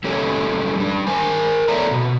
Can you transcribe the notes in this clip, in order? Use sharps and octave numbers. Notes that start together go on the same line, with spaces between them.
G3 G#3 C#4 G4 A4 C#5
G3 D4
A#4 C5 G#5
B3 A4 C#5 D5 E5 A#5
B2